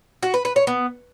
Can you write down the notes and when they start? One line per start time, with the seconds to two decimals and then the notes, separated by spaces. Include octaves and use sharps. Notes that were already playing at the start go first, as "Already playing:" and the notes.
0.23 F#4
0.34 B4
0.45 B4
0.56 C#5
0.67 B3